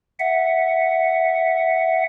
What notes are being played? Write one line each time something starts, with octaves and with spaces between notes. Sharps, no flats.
E5 F#5